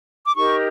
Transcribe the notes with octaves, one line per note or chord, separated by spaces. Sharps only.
D6
D#4 G4 A#4 C#6